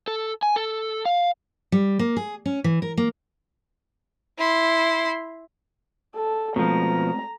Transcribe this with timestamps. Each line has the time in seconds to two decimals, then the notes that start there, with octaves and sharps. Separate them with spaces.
0.08 A4
0.43 G#5
0.56 A4
1.05 F5
1.72 G3
1.99 A#3
2.17 G#4
2.46 C#4
2.64 E3
2.82 A#4
2.97 A#3
4.38 E4 C6
6.15 A4
6.56 B2 F3 G#3 A3 C4 A#5